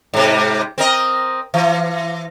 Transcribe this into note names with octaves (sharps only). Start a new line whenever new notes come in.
G#2 C3
C4 A#4 D#5
E3